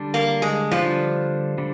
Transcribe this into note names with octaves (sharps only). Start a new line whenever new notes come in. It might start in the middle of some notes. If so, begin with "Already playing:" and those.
Already playing: D3 G3 D4
A#3
G#3
D3 F3 G3 D4
D3 G3